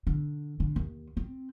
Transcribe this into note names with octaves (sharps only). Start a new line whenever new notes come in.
D3
D3
D#2
C4